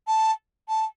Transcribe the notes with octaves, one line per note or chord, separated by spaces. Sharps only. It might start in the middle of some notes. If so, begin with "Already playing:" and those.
A5
A5